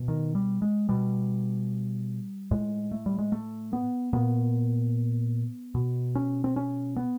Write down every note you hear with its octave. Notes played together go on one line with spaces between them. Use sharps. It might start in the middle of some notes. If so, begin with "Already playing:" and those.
Already playing: B2
D#3
G3
G#3
B2 G3
A2 G#3
A3
G3
G#3
A3
B3
A#2 B3
B2
C#4
C4
C#4
B3